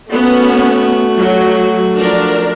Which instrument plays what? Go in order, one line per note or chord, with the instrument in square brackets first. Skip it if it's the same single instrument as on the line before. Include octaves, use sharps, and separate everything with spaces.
[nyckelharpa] A3 F#4 [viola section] B3 C#4
[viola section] F#3
F3 D4 A#4